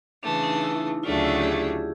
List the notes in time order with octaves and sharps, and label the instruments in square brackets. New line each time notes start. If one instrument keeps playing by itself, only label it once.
[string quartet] C#3 E3 A3 [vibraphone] D4
[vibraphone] D#4
E4
[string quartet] D2 C#3 F#3 A3 D4 [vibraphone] F4
[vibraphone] E4
G4
G#4
G#4